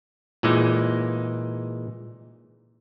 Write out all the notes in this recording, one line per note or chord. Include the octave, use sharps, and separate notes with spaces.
A#2 E3 G#3 D#4